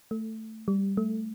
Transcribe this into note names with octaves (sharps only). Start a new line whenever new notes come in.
A3
G3
A3